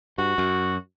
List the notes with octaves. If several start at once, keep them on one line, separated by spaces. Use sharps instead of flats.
G2 F#4
F#2